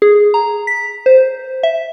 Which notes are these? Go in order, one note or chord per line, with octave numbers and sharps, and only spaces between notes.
G#4
A#5
B6
C5
E5